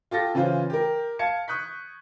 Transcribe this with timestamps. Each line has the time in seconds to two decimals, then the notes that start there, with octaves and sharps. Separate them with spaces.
0.11 F4 G4 A4 A6 A#6
0.34 C#3 E3 C#4 F4 C5
0.70 G4 A#4
1.19 F5 A5 G#6 C#7
1.48 C#6 D#6 F#6 G6 B6